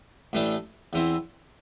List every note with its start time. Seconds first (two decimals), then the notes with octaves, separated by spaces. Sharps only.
0.33 A1 A2 E3 A3 D4
0.93 E2 E3 C4 E4